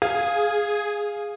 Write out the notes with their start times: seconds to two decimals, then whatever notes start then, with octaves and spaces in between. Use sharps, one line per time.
0.02 G#4 F5